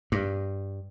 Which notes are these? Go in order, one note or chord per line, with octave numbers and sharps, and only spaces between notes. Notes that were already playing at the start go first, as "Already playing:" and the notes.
G2